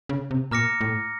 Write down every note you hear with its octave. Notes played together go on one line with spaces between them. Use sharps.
C#3
C3
A#2 A#5 D6 F6 A#6 C#7
A2